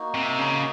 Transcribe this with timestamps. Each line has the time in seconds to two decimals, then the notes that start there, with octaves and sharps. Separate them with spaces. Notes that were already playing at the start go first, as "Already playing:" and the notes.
Already playing: A#3 D#4 F#4
0.14 C3
0.38 C#3